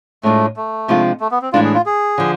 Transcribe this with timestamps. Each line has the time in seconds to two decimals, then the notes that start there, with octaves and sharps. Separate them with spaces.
0.23 A2 G#3 A3 D4 F4
0.57 A3
0.88 C3 F3 G#3 D4 F4
1.20 A3
1.31 B3
1.42 C4
1.53 A2 E3 G#3 D4 F4
1.64 G#4
1.74 F4
1.86 G#4
2.18 D3 F3